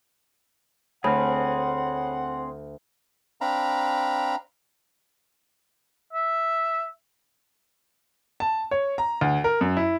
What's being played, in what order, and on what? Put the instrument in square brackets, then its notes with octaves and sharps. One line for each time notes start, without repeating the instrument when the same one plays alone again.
[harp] D2 F6 [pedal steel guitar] C4 G#4 [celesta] C#5 B5 [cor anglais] F#5
[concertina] C4 D4 F5 A#5 B5
[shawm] E5
[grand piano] A5
C#5
A#5
D2
A#4
F#2
E4